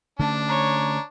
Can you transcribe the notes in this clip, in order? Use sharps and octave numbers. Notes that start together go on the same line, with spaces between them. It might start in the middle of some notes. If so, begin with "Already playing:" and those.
D3 A3 C#4 D4 A5
C#5 A#5